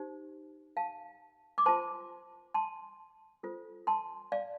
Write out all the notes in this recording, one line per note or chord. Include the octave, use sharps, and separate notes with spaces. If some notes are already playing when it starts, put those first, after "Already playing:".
Already playing: D#4 G4 C5
F5 A5
D6
F4 C5 A5 C6
A5 C6
F4 A4 C5
A5 C6
D5 F5